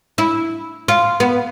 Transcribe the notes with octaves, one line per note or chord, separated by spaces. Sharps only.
E4
F4
B3